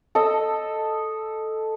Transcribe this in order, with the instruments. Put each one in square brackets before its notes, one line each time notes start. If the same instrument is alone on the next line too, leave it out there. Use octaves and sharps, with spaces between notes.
[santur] A4 D#5 E6